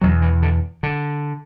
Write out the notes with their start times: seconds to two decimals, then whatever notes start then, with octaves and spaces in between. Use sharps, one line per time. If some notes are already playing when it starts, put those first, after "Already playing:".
0.01 E2 B2 F#3
0.22 E3
0.42 D3
0.83 D3